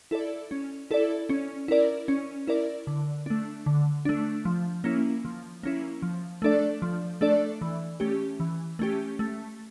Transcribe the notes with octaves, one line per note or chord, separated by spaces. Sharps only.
E4 A4 D5
C#4
E4 A4 D5
C#4
E4 A#4 D5
C#4
E4 A#4 D5
D3
A3 D4
D3
A3 D4
F3
A#3 C#4 E4
F3
A#3 C#4 E4
F3
A3 D4 A4 D5
F3
A3 D4 A4 D5
E3
A3 C#4 G4
E3
A3 C#4 G4
A3